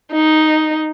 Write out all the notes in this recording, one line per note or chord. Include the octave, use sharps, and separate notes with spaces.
D#4